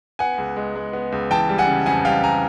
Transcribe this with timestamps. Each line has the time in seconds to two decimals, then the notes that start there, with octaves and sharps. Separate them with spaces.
0.19 B3 F#5 G#5
0.38 C#2
0.56 G#3
0.76 G#3
0.93 B3
1.12 C#2
1.31 E3 G5 A5
1.49 G3
1.58 F#5 G#5
1.67 C#3
1.86 F2 F#5 G#5
2.05 G3 F5 G5
2.24 G3 G#5 A#5